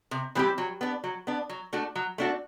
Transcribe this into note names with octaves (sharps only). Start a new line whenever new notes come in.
C3
E3 G3 C4 G4
F#3
B3 D4
F#3
B3 D4
F#3
A3 D4 F#4
F#3
A3 D4 F#4